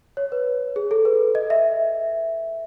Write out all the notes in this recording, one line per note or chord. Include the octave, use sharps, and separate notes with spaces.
C#5
B4
G#4
A4
B4
D#5
E5